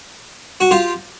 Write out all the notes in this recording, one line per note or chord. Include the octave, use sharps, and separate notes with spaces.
F#4
F4 G4